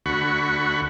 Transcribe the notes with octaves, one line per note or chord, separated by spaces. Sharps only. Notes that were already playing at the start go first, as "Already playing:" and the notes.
D2 F#4 B5 C#6